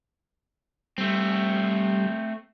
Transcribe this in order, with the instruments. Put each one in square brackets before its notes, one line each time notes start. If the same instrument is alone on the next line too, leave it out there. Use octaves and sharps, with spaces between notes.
[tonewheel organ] G3 [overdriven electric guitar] A3 C4